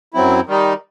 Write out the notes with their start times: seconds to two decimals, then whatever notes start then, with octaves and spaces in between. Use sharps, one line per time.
0.14 F#2 F#3 C4 E4
0.47 D#3 G3 D#4